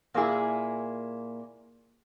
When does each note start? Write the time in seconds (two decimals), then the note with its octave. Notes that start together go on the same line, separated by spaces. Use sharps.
0.14 A#2 A#3 E4 G#4